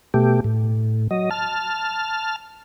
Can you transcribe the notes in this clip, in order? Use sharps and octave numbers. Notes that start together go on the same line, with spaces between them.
B2 A3 G4
A2
F#3 D#5
A5 F6